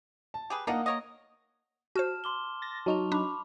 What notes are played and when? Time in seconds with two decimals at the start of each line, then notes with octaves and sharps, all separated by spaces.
0.34 A5
0.50 G4 G#4 B4
0.67 A#3 D4 D#4 D#5 F#5
0.86 A#4 C#5 D#5
1.96 F#4 C5 A5 F6 E7
2.24 C6 D6 G7
2.62 A6 A#6
2.86 F#3 D#4 A5 C#6 F7
3.12 D4 B5 D6